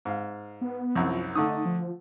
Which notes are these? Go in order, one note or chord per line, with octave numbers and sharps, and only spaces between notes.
G#2 F5
B3
C2 F#2 F3
D3 A3 D#4 D#6
F3